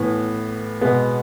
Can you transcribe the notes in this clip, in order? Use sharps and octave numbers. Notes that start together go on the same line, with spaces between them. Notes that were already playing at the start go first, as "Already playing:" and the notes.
Already playing: A2 E3 B3
B2 G#3 B3